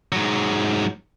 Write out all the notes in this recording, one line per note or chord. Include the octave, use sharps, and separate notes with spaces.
G#2 F#3